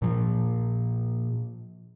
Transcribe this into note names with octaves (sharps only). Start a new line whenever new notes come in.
A#2 F3